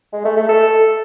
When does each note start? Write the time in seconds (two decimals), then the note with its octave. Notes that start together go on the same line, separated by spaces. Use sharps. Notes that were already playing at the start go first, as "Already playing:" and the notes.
0.13 G#3
0.25 A3
0.37 A3
0.49 A4